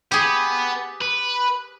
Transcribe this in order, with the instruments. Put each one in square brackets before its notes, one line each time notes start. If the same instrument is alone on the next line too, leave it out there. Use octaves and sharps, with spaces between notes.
[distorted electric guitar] B3 [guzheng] G4 G#4
[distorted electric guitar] B4